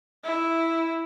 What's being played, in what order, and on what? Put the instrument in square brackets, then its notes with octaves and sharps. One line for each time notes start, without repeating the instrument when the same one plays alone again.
[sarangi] E4